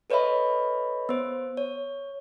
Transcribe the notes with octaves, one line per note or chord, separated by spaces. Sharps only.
A4 B4 C#5 D#5 E5 B5
B3 C5
C#5